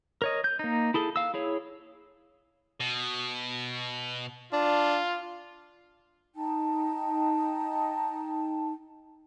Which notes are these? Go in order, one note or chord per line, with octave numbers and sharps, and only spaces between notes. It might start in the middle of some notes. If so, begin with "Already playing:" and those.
A#4 C#5 D#5
G6
A#3 D#4
E4 G#4 A4
F5 E6
E4 G#4 C#5
B2
D4 F4
D#4 G5 A5